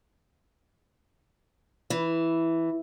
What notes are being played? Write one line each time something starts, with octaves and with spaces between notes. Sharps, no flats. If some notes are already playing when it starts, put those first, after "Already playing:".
E3